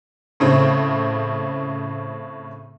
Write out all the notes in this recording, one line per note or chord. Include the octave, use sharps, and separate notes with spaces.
A2 C#3 C4